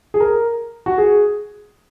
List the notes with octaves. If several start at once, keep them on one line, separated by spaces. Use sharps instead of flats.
G#4
A#4
F#4
G#4